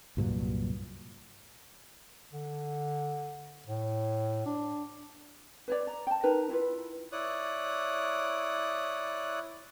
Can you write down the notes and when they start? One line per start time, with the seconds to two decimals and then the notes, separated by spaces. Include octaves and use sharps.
0.17 C2 G2 A#2 F#3
2.33 D3
3.66 A2
4.46 D4
5.68 B4 C#5 D5
5.87 A#5
6.07 G5 A5
6.23 D#4 A#4 B4 A#5
6.49 E4 F4 B4
7.12 E4 C#5 D5 D#6 F#6